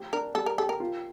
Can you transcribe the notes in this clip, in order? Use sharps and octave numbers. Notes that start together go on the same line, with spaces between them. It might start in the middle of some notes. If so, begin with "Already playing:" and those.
Already playing: F3 A3 G4
D4 A#4
G3 A4
A#4
G4 A4
A#4
F4